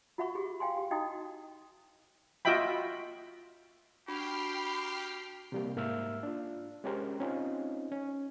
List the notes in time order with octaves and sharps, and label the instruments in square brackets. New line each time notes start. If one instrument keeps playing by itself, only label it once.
[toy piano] F4 F#4 E5 F#5 B5 C#6
G4 G#4
F5 G5 G#5 C6
G4
D#4 E4 F#4 D#5 G5 D#6
[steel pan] F4 F#4 D#5 E5 G5 B5
[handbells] D4 F#4 A5 [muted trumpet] G4 [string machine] G5 F6 C7 [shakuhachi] B5
[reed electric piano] C3 G3 A#3
G#2 A#3 E5 E6 F6
D4 F4
G#3 C#4 G4 A#4 C5
C4 C#4 D#4 F4
C#4